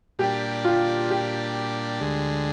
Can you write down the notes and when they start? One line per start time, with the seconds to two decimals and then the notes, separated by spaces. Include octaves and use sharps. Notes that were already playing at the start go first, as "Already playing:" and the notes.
0.19 A#2 G3 D4 G4
0.65 F4
1.11 G4
2.01 D2 D3 G#3